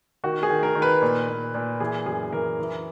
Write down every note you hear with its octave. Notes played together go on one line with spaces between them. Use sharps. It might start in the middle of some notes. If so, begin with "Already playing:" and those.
D#3 F#4
G#4
D#3
A#4
D#3
B4
A#2
A#2
A#2
E3 G#4
F#2 G#4
E3 A#4
E3